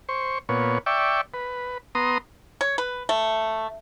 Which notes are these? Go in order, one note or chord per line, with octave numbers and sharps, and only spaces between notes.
C5 C#6
A#2 B3 C#5
D5 E5 G5 C#6
B4
B3 A#5 C6 D#6
C#5
B4
A3